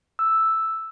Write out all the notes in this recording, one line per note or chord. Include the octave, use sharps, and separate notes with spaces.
E6